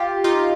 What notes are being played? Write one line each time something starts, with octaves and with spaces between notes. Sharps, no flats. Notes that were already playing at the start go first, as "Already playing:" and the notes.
Already playing: F4 G4
D#4 F4